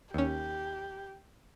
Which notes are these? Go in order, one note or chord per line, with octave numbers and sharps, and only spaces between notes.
D#2 C#4 G4